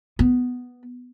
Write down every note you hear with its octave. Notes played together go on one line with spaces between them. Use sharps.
B3